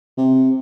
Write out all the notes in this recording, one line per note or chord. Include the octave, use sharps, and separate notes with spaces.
C3